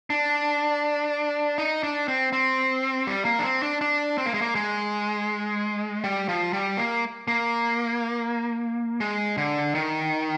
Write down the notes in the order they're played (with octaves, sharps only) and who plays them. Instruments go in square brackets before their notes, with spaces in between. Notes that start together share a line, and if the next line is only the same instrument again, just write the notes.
[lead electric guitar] D4
D#4
D4
C4
C4
G3
A#3
D4
C4
D4
D4
C4
A#3
G#3
A#3
G#3
G3
F3
G3
A#3
A#3
G#3
D3
D#3